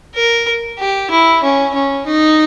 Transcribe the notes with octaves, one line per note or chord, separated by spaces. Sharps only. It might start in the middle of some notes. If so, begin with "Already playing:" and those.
A#4
G4
E4
C#4
C#4
D#4